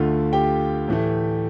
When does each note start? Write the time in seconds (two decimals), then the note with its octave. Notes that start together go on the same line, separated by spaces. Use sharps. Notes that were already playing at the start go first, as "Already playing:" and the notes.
Already playing: D2 D3 A3 F4 F5
0.33 G4 G5
0.88 A2 E3 A3